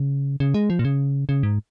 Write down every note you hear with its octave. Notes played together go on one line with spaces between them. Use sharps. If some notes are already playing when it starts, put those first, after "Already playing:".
Already playing: C#3
C#3
G#3
F3
A#2
C#3
C#3
G#2